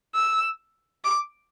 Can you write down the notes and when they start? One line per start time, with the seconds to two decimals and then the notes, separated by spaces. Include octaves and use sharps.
0.15 E6
1.04 D6